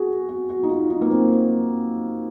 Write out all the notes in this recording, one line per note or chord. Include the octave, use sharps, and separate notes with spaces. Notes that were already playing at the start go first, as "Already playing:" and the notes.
Already playing: F#4 G#4
F#4
F#4
D#4
F4
D#4
A#3
C4